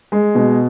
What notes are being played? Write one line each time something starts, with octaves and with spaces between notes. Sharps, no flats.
G#3
B2